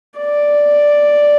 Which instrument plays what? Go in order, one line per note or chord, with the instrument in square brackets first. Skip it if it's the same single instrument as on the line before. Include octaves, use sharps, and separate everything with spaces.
[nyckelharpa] D5